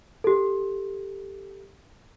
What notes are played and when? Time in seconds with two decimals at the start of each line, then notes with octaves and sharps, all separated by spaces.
0.24 G4 A4